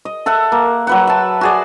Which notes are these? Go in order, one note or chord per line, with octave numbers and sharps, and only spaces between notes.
D#5
A4 E5 F#5
A#3
F#3 B4 F#5
E5 A5
F#4 G#4 D5